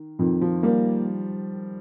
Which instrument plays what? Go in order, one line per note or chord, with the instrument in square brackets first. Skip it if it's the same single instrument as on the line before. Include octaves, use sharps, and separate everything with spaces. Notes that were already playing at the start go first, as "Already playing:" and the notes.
Already playing: [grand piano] D#3
[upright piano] F2 [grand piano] D#3
[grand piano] F3
[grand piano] G3 [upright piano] A#3